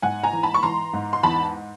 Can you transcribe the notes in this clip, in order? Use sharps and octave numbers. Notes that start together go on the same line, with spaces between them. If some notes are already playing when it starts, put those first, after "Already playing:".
G#2 F#5 G#5
G#5 A#5
E3
A5 B5
C#6
E3 A#5 C6
G#2
C6
E2 A5 B5